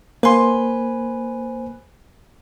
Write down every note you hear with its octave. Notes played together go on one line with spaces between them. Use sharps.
A#3 B4 C5 G#5 C6